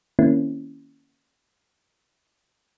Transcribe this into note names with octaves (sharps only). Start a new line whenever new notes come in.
D#3 A#3 C4 C#4 E4